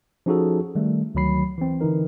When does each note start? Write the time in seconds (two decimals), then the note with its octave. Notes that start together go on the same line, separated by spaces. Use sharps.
0.26 F3 C#4 D#4 F#4 G#4 A4
0.75 D#3 G3 A3
1.15 D2 D#3 F#3 B5 C7
1.58 E3 C4
1.81 D3 E3 D#4 A#4